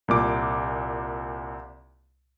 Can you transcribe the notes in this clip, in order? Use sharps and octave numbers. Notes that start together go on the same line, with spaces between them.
C2 A#2 D6